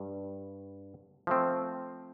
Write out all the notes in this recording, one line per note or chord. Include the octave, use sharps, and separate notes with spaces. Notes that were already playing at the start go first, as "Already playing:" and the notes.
Already playing: G2 G3
F3 A3 C4